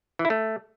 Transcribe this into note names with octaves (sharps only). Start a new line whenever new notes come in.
E3
E4
A3